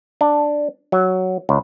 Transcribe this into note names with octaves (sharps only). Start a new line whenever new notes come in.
D4
F#3
C#2